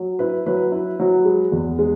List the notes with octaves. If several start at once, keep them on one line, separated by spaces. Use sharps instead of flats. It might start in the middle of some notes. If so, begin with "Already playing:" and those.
Already playing: F#3
E4 B4
F#3 B4
E4
F#3
G#3
E2
G#3